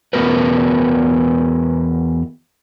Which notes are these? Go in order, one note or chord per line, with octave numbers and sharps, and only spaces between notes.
E2 B3 F#4 A#4 B4